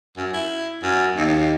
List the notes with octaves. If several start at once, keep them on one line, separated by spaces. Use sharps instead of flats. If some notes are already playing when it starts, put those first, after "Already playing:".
F#2
E4
F#2
D#2